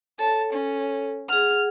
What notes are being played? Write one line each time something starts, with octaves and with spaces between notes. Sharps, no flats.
A4 C#5 A5
C#4
G#4 F#5 F6